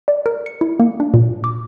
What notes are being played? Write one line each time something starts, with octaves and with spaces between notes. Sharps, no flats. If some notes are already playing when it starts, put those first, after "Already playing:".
D5
A#4
C#7
E4
A#3
D4
A#2
D6